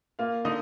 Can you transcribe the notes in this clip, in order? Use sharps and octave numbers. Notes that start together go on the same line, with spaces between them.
A#3 F4 F5
D3 D#4 D#5